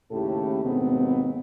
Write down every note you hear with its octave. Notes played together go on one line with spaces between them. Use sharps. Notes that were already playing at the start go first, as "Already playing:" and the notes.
D#2 A2 C#3 G4 A4
D#2 G#2 B2 B3 C4